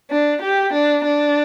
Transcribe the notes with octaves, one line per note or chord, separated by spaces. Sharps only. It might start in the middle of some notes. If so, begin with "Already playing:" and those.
D4
G4
D4
D4